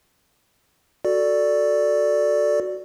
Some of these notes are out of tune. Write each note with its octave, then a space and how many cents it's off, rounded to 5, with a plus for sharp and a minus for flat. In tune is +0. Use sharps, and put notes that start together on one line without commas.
F#4 +0 A4 +0 D5 +0